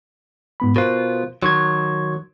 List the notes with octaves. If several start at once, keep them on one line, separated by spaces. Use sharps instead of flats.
G#2 B3 B5
B2 F4 A#4 C5 F#6
D#3 F#3 C6 C#6 G#6